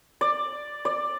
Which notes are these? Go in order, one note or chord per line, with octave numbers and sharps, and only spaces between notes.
D5
D5